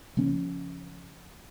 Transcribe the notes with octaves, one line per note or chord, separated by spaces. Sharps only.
C#3 F3 A#3 C#4